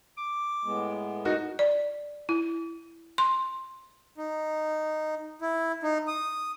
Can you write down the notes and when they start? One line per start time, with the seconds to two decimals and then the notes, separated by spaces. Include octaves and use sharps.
0.18 D6
0.65 A2 G#3 B3
1.25 D#4 F#4 A#4
1.59 D5
2.29 E4
3.18 C6
4.17 D#4
5.41 E4
5.83 D#4
6.07 D#6